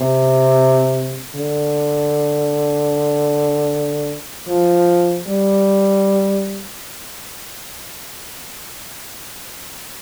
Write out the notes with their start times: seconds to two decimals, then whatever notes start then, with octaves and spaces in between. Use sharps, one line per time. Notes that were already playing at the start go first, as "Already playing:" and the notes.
Already playing: C3
1.35 D3
4.47 F3
5.26 G3